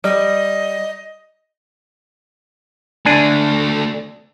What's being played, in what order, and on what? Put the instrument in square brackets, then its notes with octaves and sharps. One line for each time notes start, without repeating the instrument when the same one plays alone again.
[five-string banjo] G3 [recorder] D#5
[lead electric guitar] D3 A3 [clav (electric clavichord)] D4 G#5